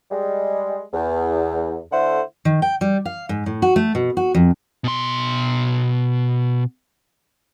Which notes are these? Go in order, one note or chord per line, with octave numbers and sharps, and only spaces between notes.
G3 G#3
E2
D3 A3 E4 C5 F#5
D#3
G5
G3
F5
G#2
A2
F#4
A3
B2
F#4
F2
B2 C6